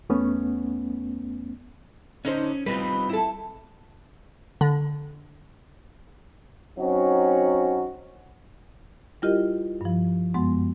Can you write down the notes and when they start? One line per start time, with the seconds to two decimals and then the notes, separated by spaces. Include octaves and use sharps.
0.09 E2 A3 B3 C#4
2.25 D3 C#4 D#4 C5
2.66 G3 B3 C4 D#4 F4 B4
3.09 E4 A4
4.61 D3
6.79 F#3 C4 C#4 D#4 F#4
9.22 G3 E4 F4 G4 A#4 D#5
9.81 G2 F3
10.34 F#2 G#3 B3 F#5 C6